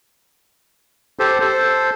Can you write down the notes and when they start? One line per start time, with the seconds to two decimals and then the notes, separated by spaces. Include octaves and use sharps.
1.19 G4 A4 C5
1.41 A4 C5